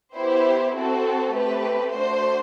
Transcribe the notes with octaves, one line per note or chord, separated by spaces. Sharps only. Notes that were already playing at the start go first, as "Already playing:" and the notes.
B3 E4 G4 C5
C4 F#4 A4
A3 C4 G4 B4
A3 D4 F#4 C5